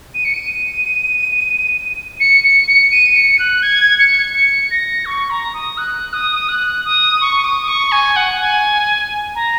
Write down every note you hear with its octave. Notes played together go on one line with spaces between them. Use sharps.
D#7
C#7
D#7
C#7
C#7
C#7
D#7
C#7
F#6
G#6
C#7
C#7
A#6
C#6
A#5
D#6
F#6
D#6
F#6
D#6
C#6
D#6
C#6
G#5
F#5
G#5
A#5